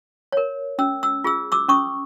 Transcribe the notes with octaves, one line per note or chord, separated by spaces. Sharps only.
A#4 C#5
C#4 E6
E6
F4 G#4 E6
D6 E6
C#4 C#6 D#6